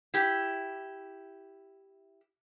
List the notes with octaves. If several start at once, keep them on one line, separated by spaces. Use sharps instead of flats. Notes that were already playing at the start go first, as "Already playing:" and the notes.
E4 G4